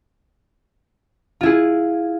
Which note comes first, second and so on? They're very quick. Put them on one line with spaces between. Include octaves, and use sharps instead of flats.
F4 E4 G#4